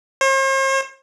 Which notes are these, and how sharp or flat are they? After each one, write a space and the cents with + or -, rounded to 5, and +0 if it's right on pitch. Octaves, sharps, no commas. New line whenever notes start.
C5 +45